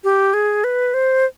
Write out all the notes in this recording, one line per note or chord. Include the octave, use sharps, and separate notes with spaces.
G4
G#4
B4
C5